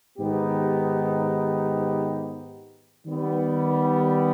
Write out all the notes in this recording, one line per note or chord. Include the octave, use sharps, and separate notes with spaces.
G#2 D#3 B3 D#4 G4
D#3 G3 B3